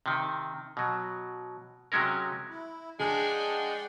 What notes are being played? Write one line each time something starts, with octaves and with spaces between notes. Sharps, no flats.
C3 D#3
B2 F#3
C3 F#3 G#3 C#4 A#4
E4
G#3 D4 G#4 D5 F#5 G5